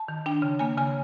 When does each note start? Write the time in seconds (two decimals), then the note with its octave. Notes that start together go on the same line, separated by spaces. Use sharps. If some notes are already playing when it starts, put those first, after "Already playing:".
Already playing: A5
0.08 D#3
0.26 D4 G5
0.42 C#3
0.59 A#3 G#5
0.78 C#3 G#5